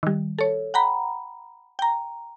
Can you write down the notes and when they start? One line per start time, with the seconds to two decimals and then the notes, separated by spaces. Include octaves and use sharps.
0.03 D#3 G3
0.39 A4 C#5
0.74 F#5 G5 A#5 B5
1.79 G5 A#5